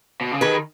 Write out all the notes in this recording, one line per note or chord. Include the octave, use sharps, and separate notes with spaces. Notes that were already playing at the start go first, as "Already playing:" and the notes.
B2
C#3
D#3 G#4 B4